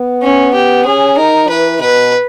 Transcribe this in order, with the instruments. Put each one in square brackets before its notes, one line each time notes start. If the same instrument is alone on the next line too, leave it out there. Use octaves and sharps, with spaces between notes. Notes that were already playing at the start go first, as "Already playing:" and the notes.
Already playing: [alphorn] B3
[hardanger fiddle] C#4
G4
[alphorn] C#4 [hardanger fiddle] G#4
[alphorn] D#4 [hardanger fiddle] A#4
[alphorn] E3 [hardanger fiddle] B4
[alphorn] B2 [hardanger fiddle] B4